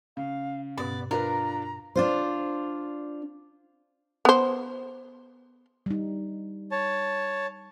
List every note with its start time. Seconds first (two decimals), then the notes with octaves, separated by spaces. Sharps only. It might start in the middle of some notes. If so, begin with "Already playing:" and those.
0.17 C#3 F5
0.78 G2 B2 B3 D5
1.11 D4 F4 A#4 B4 A#5
1.96 D4 F4 C5
4.25 B3 C5
5.86 G3 D#4
6.72 C#5 A5